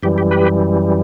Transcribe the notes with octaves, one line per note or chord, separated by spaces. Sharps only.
F#2 E3 G3 G4
G4
G4 B4